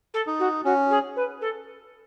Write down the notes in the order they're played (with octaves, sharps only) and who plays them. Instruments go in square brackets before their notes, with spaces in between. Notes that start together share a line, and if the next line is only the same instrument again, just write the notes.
[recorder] A4
[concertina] D#4
[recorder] F#4
[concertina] C#4 [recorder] F#4
[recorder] G#4
B4
A4